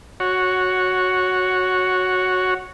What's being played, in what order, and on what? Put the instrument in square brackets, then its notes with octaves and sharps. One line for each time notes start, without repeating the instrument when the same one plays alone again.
[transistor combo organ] F#4 C#5